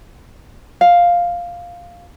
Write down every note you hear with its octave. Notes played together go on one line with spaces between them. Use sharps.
F5